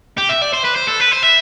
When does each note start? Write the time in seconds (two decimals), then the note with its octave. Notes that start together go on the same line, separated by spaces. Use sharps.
0.18 G4
0.29 E5
0.42 D5
0.53 C5
0.64 B4
0.76 C5
0.88 A4
1.00 B4
1.12 C5
1.23 E5